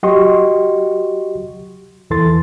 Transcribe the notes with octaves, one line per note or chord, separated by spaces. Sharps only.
F#3 F#4 G4 D#5 C6 C#6
E2 E3 A4 C6 A6